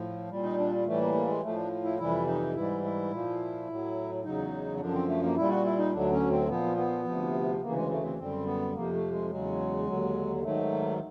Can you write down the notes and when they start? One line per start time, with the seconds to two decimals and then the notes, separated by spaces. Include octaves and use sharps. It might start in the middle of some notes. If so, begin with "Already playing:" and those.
Already playing: A2 F3
0.30 A#2 G3
0.43 D#4
0.58 D4
0.86 A2 E3 G3 A3
1.00 A#3
1.14 A#3
1.28 G#3
1.43 A2 F3 A3
1.56 D4
1.84 E4
1.98 F2 C3 E3 G3 E4
2.27 D#4
2.55 G#2 E3 G3 E4
2.84 E4
3.11 A#2 F3
3.67 A2 F#3
4.24 E2 C#3 F#3 D#4
4.80 F#2 D3 F3 D4
4.94 C4
5.08 A3
5.23 A#3
5.37 A#2 G3 E4
5.50 F#4
5.65 E4
5.78 D#4
5.93 D2 D3 F#3 D4
6.12 C#4
6.30 C4
6.49 A#2 F3 B3
6.77 B3
7.05 D2 C3 F3
7.62 D2 C#3 E3 A#3
7.75 G#3
7.90 A3
8.04 C4
8.18 F#2 D3 G3 C4
8.46 B3
8.74 F2 C3 F3 A#3
8.93 A3
9.11 G#3
9.30 E2 C#3 F#3 G#3
9.87 D#2 D3 F#3
10.43 G#2 D#3 F#3 A3